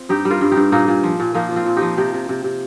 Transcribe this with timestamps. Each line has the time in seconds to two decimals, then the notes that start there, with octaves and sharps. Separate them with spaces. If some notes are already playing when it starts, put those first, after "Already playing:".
Already playing: C4 F4
0.09 G2 D#4 G4
0.25 G3
0.30 F4 A#4
0.41 G2
0.52 D#4 G4
0.57 G2
0.72 A#2 A#3 D#4
0.88 A#2
1.03 F3
1.20 A#2
1.34 F3 A#3 D#4
1.51 F3
1.56 C4 F4
1.66 A#2
1.76 F3 D#4 G4
1.97 C3 D#4 G4
2.14 C3
2.29 C3
2.44 C3